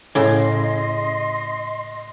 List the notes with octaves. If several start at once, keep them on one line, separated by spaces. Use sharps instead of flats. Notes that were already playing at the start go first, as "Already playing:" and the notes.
A2 C#3 D#5 C6